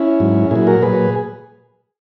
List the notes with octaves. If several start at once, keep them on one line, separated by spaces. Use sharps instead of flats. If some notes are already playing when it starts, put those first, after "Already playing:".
Already playing: C#4 E4
G#2 F#3
A#2 F#3 E4 G#4
F#4 A#4
A#2 F#3 G#4 B4